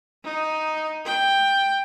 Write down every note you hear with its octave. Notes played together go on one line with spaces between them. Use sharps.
D#4
G5